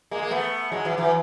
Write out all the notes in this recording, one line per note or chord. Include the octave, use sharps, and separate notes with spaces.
G#3 A#3
A#3
A3 B3
F#3 G#3
E3 F#3
E3 F#3